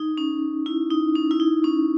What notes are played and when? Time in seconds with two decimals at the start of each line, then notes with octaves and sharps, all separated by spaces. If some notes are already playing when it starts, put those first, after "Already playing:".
Already playing: D#4
0.18 C#4
0.66 E4
0.91 D#4
1.15 C#4
1.31 E4
1.40 D#4
1.64 C#4